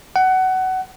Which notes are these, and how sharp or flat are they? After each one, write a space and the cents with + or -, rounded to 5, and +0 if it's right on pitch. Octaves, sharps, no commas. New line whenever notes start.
F#5 +20